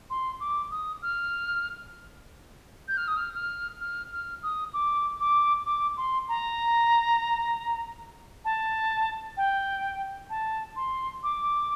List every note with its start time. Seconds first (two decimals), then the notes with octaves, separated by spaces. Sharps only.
0.10 C6
0.40 D6
0.71 D#6
1.02 F6
2.88 G6
2.97 F6
3.08 D#6
3.17 F6
3.35 F6
3.80 F6
4.12 F6
4.43 D#6
4.74 D6
5.20 D6
5.66 D6
5.97 C6
6.29 A#5
8.45 A5
9.37 G5
10.30 A5
10.76 C6
11.23 D6